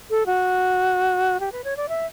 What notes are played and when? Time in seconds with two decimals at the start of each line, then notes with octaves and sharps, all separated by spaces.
0.10 A4
0.26 F#4
1.40 G4
1.52 B4
1.64 C#5
1.77 D5
1.89 E5